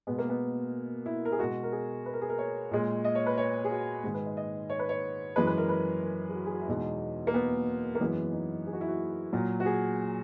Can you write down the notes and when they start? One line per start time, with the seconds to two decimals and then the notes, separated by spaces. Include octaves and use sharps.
0.07 B2 G#3 B3
0.19 A#3
0.29 B3
1.06 E4
1.25 A#4
1.32 G#4
1.39 B2 G#3 F#4
1.63 A#4
1.72 G#4
2.06 B4
2.13 A#4
2.21 G#4
2.29 A#4
2.38 C#5
2.71 A#2 G#3
3.04 D#5
3.15 C#5
3.26 B4
3.38 C#5
3.65 G#4
3.71 F#4
4.04 G#2 D#3 G#3 G#4
4.14 B4
4.26 D#5
4.37 D#5
4.70 C#5
4.79 B4
4.89 C#5
5.36 F#2 E3 G#3 B4
5.47 B4
5.58 A#4
5.69 B4
6.02 A#4
6.30 G#4
6.35 F#4
6.46 G#4
6.53 F#4
6.61 E4
6.68 E2 B2 G#3 D#4
7.27 A#3
7.34 B3
7.95 A#3
8.00 F#2 E3 G#3 B3
8.33 D#4
8.67 G#4
8.73 F#4
8.81 E4
8.88 F#4
9.33 A#2 F#3
9.60 F#4
9.66 G#4